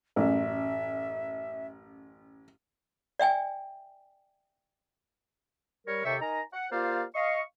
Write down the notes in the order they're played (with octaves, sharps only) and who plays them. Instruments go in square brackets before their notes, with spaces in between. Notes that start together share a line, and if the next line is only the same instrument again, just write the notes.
[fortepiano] A1 F#2 [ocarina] E5
[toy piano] D5 E5 G5 G#5
[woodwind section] G3 A#4 C#5
D#2 C3 A4 E5 G5 C#6
D#4 A#4 G#5 A#5
F#5
A#3 F4 G4 C5 D5 F5
D#5 F5 C#6